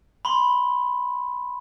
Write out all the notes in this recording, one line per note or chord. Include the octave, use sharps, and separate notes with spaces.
B5 C6